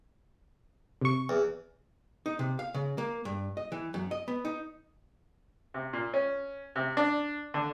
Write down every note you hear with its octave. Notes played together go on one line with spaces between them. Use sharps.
C3 C#6
E2
D#4
C3
F5
C#3
A#3
G2
D#5
E3
F#2
D#5
B3
D#4
C3
A#2
C#4
C3
D4
D3